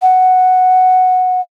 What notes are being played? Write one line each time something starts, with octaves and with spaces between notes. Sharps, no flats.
F#5